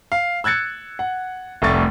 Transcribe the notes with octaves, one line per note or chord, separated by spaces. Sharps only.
F5
E6 F#6 G#6 A6 C#7
F#5
F1 C2 A3 C#6 A6